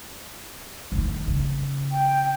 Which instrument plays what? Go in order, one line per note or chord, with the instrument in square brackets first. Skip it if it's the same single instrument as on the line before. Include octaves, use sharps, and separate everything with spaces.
[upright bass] D#3 E3
C#3
[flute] G5